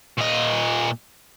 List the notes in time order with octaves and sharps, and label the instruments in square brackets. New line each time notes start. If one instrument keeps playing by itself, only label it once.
[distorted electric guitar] A#2 D#5